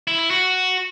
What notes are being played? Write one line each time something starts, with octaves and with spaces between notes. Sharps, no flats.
E4
E4
F#4